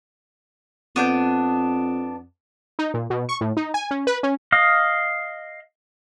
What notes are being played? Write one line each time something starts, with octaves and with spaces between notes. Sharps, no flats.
F2 B3 D4 G6
D#4
A#2
B2
C#6
A2
D#4
G#5
C#4
B4
C#4
D#5 F5